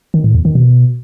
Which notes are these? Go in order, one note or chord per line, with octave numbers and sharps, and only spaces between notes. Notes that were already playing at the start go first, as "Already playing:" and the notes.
D#3
A2
E2
D#3
B2